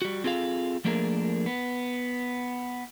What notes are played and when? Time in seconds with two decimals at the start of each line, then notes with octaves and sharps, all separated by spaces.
0.02 G3 F#4
0.24 C4 F4 G#4 A4 F5
0.85 F3 A3 A#3 D4 G#4 A#4
1.46 B3